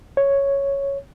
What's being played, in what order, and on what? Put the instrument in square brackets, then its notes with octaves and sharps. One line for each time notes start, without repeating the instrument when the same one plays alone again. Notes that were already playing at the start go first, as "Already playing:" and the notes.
[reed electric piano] C#5